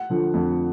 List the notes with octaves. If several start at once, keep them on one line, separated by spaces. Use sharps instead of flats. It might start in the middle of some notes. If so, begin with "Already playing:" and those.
Already playing: F#5
D3 F3
F2